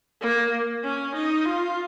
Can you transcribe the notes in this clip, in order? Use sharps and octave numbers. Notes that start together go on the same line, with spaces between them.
A#3
C#4
D#4
F4